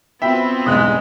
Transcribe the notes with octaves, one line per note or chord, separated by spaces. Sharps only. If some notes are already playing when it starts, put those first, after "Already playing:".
B3 C4 F4 F#4 E5 G5 B5
B1 E2 G2 G#3 D#6 F#6